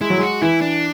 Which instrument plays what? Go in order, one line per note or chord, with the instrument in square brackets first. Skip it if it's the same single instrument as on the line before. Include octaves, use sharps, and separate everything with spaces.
[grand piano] G#3 [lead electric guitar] E4
[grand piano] F#3
[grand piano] G#3 [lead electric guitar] F#4
[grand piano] E3 [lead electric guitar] E4
[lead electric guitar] D4